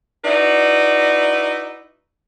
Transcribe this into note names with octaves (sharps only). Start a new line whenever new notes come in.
D#4 E4 F#4 B4 D5